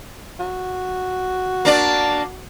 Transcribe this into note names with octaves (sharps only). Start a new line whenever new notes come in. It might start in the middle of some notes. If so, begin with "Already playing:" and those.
F#4
A#3 D4 D5